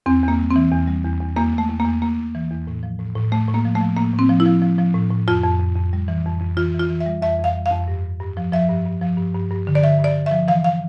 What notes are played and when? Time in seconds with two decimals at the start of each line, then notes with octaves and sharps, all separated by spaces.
0.06 E2 C4
0.23 E2 A#3
0.39 G3
0.51 C4
0.56 E3
0.72 E2
0.87 G3
1.05 E2
1.21 E2
1.37 E2 A#3
1.54 E2 A3
1.69 E2
1.80 A#3
1.86 E2
2.02 E2 A#3
2.18 E2
2.35 E3
2.51 E2
2.67 A2
2.83 F3
2.99 A2
3.15 A2
3.32 A2 A3
3.48 A2
3.54 A#3
3.65 F3
3.75 A3
3.81 F3
3.97 A2 A#3
4.13 A2
4.19 C4
4.29 F3
4.40 E4
4.46 F3
4.62 F3
4.78 F3
4.94 A2
5.10 A2
5.28 F2 F4
5.43 F2
5.59 F2
5.76 F2
5.93 G3
6.08 E3
6.26 F2
6.41 F2
6.57 E3 F4
6.74 E3
6.80 F4
6.90 E3
7.00 E5
7.06 G3
7.22 F2 E5
7.39 F2
7.44 F5
7.56 G3
7.66 F5
7.71 F2
7.88 G2
8.04 G2
8.20 G2
8.37 F3
8.52 F3 E5
8.69 G2
8.85 G2
9.01 F3
9.18 G2
9.34 G2
9.51 G2
9.67 D3
9.75 D5
9.83 D3 E5
9.99 G2
10.04 D5
10.16 D3
10.26 E5
10.31 F3
10.48 E3 F5
10.64 F5